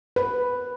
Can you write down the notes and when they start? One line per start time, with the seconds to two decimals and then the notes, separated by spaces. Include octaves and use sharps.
0.16 B4